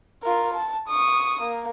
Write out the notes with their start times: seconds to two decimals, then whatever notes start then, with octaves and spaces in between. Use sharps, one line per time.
0.23 F4 A#4
0.54 A5
0.89 C#6 D#6
1.42 A#3